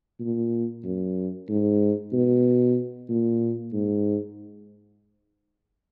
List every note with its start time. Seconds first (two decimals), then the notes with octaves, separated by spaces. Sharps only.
0.20 A#2
0.84 F#2
1.49 G#2
2.13 B2
3.09 A#2
3.73 G#2